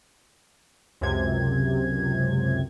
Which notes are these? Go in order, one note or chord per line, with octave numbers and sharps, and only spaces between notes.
C#2 F#2 C3 G#6